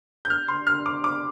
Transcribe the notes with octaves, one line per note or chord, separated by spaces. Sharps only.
G6
F6
C6
F6
D6
D6